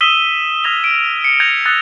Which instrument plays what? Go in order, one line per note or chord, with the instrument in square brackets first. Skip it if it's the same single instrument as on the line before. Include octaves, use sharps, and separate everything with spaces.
[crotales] D#6 E6 B6 D#7 E7 G7
D#6 F6 G#6 A#6 F7 G7
D7
C#7
G6 G#6 A#6 D7 F7
D#6 E6 F#6 A6 C#7 G7